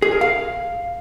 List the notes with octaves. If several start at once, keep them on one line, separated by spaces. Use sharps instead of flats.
G#4
A#4
F5